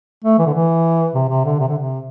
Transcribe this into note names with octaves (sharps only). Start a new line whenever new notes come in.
A3
E3
D3
E3
C3
C3
D3
C3
D3
C3